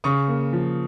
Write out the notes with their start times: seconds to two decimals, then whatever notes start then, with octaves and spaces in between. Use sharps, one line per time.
0.04 C#3 C#6 D#6
0.28 A#3
0.53 F3